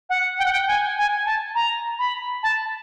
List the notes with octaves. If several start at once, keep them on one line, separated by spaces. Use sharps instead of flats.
F#5
G5
F#5
G5
G#5
G#5
A5
A#5
B5
A5